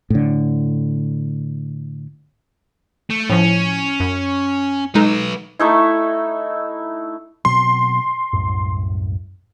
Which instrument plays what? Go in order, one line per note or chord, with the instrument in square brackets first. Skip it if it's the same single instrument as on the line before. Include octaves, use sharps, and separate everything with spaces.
[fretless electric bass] A2 D3
[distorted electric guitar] A3
[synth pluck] A2 F3 [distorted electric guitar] C#4
[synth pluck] F#2
[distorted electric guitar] F#3 B4 [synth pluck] G#3 D#4 A4
[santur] A3 D#4 E4
[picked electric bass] B2 F#3 C4 [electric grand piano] C6
[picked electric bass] C2 F#2 A2